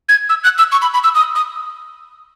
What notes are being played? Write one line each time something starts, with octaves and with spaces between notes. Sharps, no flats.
G#6
E6
F#6
E6
C#6
B5
B5
E6
D#6
D#6